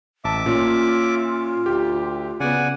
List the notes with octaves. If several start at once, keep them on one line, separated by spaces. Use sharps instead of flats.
A1 E5 A5 D6
A#2 C#4 F4
D2 G4
C#3 B3 D5 F#5 G#5